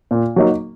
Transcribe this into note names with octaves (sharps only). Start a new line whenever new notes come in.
A#2
F#3 A#3 D#4